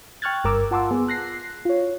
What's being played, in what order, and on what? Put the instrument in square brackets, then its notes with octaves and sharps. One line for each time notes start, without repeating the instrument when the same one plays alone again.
[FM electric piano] G5 C#6 F6 F#6 G#6 A6
G1 G2 A#4 A#5 D6 E6
F4 F#5 A5 C6 D6 E6
B3 G#4
F#6 A#6 C7
F4 C#5